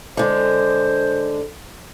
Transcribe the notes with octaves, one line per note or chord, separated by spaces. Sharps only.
D3 G#3 C5